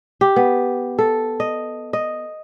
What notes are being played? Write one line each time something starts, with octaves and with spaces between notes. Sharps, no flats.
G4
B3
A4
D#5
D#5